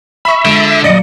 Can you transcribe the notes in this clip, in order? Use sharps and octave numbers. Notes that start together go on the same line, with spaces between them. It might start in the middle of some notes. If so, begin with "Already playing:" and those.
E5 B5 C#6
D3 G#3 F4
A#2 F#3 D5 D#5 C#7